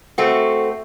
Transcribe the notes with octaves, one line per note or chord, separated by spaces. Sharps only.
A3 C4 F#4